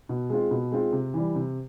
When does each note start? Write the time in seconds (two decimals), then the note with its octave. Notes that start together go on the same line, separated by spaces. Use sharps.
0.09 B2
0.30 G#3 C4 F4
0.51 B2
0.72 G#3 C4 F4
0.93 C3
1.14 E3 G3
1.35 C3